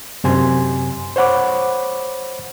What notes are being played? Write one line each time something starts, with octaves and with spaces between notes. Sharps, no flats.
F#2 C3 G#5 C6
C5 C#5 F#5 B5 D6